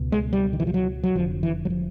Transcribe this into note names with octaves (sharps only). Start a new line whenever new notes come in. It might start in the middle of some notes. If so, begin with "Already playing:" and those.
Already playing: C#2 B2
G#3
G3
D#3
E3
F3
F#3
F#3
F1 F2 D3 F3
E3
F#3
F3